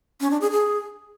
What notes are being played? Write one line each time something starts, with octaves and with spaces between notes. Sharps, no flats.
C#4
D4
G#4
G#4